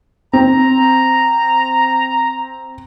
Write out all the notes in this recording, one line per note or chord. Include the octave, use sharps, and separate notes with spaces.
C4 A#5